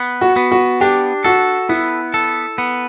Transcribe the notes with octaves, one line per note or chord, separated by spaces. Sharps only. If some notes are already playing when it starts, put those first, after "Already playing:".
Already playing: B3
F#4
B3
F#4
D4 G4
F#4 A4
B3 E4
A4
B3